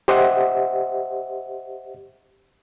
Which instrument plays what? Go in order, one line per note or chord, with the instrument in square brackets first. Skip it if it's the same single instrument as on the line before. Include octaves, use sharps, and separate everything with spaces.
[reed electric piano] G4 C5 D#5 E5 F#5